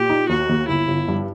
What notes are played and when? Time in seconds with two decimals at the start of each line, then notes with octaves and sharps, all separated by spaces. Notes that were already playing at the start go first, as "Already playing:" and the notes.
Already playing: A#2 G4
0.10 D#4
0.29 D#2 F#4
0.49 D#2
0.68 G1 E4
0.88 G1
1.08 G2